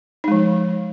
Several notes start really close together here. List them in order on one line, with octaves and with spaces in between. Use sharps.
D#4 G#3 F3